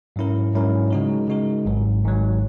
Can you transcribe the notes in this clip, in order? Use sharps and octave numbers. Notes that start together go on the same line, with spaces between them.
G#2 F#3 C#4 E4 A#4
G#2 F#3 C#4 E4 A#4
C#3 G#3 D#4 F#4 A#4
C#3 G#3 D#4 F#4 A#4
G#1 G#2 F#3
G#1 G#2 F#3